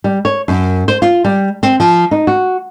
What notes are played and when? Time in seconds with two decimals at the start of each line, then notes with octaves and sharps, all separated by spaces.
0.04 G3
0.25 C#5
0.48 F#2
0.88 C5
1.02 F4
1.24 G3
1.63 C4
1.80 F3
2.11 D#4
2.27 F#4